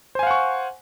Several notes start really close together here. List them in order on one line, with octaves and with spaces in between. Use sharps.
C5 G#5 F5 F#5 C#6